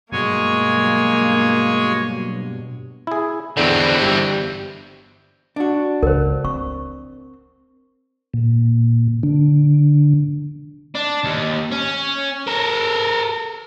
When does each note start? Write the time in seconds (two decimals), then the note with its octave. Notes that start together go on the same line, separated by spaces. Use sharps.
0.12 G2 B2 F#3 G#3 A#3 C#5 G#5
3.07 E4 G#4
3.57 E2 D3 E3 C4
4.02 G1 G3
5.56 D4 F#4
6.03 C#2 A#4 C5
6.45 C4 C#6
8.34 A#2
9.23 D3
10.95 D4
11.25 D#2
11.72 C#4
12.47 A4 A#4